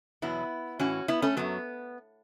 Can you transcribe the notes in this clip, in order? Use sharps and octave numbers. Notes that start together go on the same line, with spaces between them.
E2 B2 F#3 B3 E4
A2 E3 C#4 F#4
B3 E4
A3 C#4
F#2 F#3 B3